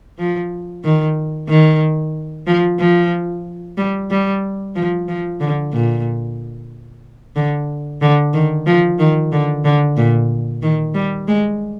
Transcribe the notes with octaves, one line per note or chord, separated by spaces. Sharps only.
F3
D#3
D#3
F3
F3
G3
G3
F3
F3
D3
A#2
D3
D3
D#3
F3
D#3
D3
D3
A#2
D#3
G3
G#3